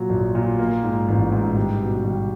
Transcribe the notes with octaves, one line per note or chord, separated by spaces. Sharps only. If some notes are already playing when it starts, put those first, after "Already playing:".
Already playing: A#2 F#3
A#1
A#2
A#3
G#2
A1
G#2
G3
B2
G3